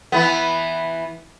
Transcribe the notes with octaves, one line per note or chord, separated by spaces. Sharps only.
E3 B3